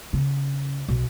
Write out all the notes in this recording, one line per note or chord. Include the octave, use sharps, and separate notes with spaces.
C#3
B1